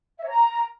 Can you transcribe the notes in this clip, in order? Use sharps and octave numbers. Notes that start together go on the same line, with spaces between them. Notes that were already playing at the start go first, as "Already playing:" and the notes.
E5
C#5
A#5